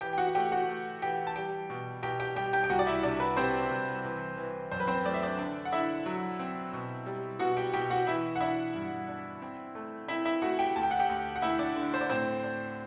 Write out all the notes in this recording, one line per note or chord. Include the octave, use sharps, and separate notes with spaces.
E3 G4 G5
G5
F#4 F#5
F#5
A3 G4 G5
F#4 F#5
A3
E3 G4 G5
A5
G3 G4 G5
B2
B2 G4 G5
G4 G5
G3 G4 G5
G4 G5
G5
C2 F#4 F#5
D5
E4 E5
C3 D4 D5
B4
C3 C4 C5
C2
E3
E3
F#2 C5
B4
C4 C5
A3 D5
E5
D4 D5
D3 D4 D5
F#5
D3 E4 E5
F#3
C4
B2
G3
B2 F#4 F#5
G4 G5
B2 G4 G5
F#4 F#5
E3 E4 E5
F#5
D4 E4 E5
G2
D4
C4
A3
C4 E4 E5
E4 E5
A3 F#4 F#5
G4 G5
D2 A5
G5
F#5
G4 G5
D2
F#5
D2 E4 E5
D4 D5
D3
C5
D5
A2 C4 C5
D4